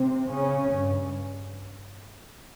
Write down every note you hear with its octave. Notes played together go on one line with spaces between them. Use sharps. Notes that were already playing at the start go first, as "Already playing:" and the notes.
Already playing: C3 C4
C#3 C#4
G2